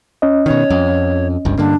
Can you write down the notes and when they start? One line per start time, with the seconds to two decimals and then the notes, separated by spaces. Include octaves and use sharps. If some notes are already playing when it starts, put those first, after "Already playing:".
0.22 C#4 D#5
0.46 B2 D#3 C#5
0.70 F2
1.45 G1 C#2 G2
1.58 G2 D3 A#3 D4